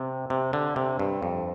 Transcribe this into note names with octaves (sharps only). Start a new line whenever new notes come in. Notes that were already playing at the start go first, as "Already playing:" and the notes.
Already playing: C3
C3
D3
C3
G2
F2